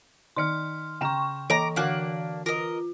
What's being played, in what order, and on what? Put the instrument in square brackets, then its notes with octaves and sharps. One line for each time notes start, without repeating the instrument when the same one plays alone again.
[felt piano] D#3 D5 C#7 [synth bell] C6 F6
[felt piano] C#3 A#5 E7 [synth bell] G5 C#6
[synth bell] E3 [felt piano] A4 D#5 A#6 [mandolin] A#5 D6
[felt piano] D3 F#4 F#5 [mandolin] A#3 D4 F#6
[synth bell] F4 [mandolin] A#4 D#5